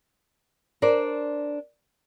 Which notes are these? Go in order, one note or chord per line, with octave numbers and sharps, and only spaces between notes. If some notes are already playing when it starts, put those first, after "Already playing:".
D4 A#4 C5 D5